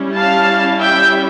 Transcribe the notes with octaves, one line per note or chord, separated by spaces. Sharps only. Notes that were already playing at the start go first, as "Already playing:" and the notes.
Already playing: G3 C#4 E4
F5 A5
E5 G5